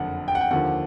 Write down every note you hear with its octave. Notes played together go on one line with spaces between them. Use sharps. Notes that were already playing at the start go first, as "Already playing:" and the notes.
Already playing: F#1 F2 D3 F#5
G5
F#5
G5
D#2 D3 F3 F#5